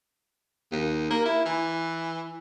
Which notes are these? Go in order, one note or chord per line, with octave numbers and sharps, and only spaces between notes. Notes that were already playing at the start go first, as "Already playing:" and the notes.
D#2
A#3
E4
E3